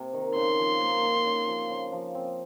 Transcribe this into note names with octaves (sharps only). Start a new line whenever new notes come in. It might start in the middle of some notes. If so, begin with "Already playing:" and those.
Already playing: C3
D#3
C#3 C6
F3
A#3
D#4
C#3
F3
C#3
F3
C4